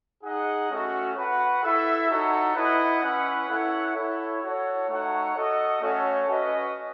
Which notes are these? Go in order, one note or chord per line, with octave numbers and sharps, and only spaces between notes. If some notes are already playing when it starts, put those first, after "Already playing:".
D#4 G#4 D#5 F#5
A3 C#4 F#4
F#4 B4 F#5
E4 A4 E5
D#4 F#4 A4 C#5 F#5
E4 B4 D#5 F#5
C#4 E4 B4 F#5
E4 A4 C#5 F#5
E4 A4 C#5
F#4 A4 C#5
A3 D#4 F#4 C#5 F#5
F#4 A4 D#5
A3 C#4 F#4 A4 C#5
C#4 F#4 B4 D#5 F#5